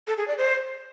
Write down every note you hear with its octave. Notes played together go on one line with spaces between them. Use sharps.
A4
G#4
D5
C5